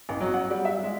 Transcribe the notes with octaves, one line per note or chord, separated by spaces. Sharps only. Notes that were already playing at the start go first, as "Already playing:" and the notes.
A1
F#3
F#5
G3
E5
G#3